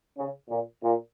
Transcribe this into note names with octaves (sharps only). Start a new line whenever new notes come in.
C#3
A#2
A#2